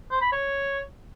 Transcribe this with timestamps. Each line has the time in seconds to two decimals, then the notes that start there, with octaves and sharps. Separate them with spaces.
0.11 C5
0.22 B5
0.33 C#5